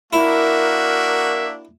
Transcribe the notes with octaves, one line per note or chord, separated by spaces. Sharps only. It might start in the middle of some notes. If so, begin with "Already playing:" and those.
A#3 D4 E4 F#4 A#4 E5